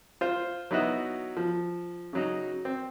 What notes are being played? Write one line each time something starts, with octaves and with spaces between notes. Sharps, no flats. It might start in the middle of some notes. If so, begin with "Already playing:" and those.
F4 C5
F#3 B3 D#4 E4 F#4
F3
C#3 F#3 D#4
C4